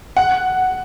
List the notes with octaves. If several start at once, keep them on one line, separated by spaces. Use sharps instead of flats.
F#5